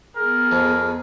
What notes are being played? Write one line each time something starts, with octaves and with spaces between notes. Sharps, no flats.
B3 G#4 A#4
F2